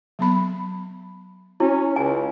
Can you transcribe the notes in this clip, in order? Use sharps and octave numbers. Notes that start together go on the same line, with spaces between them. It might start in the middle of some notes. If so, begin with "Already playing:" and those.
F#3 B3 B5
C#4 E4
C#2 G#5